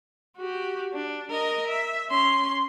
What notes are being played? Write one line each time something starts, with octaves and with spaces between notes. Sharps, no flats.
F#4 G4
D4
A#4 D#5
E5
C#4 C6